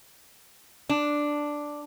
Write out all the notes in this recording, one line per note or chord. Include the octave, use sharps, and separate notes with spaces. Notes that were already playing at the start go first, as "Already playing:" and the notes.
D4